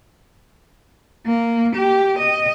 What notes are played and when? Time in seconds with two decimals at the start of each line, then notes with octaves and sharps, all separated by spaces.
1.26 A#3
1.75 G4
2.18 D#5